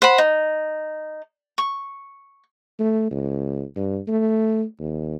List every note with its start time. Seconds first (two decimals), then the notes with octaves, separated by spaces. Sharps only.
0.02 C5 F#5 B5
0.18 D#4
1.58 C#6
2.79 A3
3.11 C#2
3.76 G2
4.08 A3
4.79 D#2